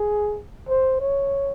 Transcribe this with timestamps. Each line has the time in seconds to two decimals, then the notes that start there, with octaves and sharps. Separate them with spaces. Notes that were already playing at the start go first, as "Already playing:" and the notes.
Already playing: G#4
0.69 C5
1.00 C#5